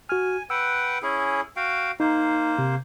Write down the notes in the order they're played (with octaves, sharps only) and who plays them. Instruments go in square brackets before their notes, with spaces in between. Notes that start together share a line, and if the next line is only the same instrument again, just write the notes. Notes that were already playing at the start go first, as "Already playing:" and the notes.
[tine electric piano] F#4 F6 [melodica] G#5
[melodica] B4 F#5 G5 [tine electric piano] E6
[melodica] C#4 E4 G#4
F#4 F5 G5
[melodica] A#3 C5 [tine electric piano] D#4
[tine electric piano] C3